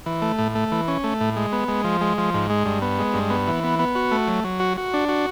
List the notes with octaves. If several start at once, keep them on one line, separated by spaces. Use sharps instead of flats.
E3
A3
A2
A3
E3
C#4
A3
A2
G#3
B3
G#3
F3
G#3
F3
G#2
G#3
G2
B3
G#3
G2
B3
E3
B3
B3
F#4
A3
F#3
F#3
F#4
F#4
D4
F#4